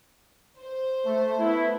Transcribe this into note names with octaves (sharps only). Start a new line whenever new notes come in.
C5
A3
A3 B3 E4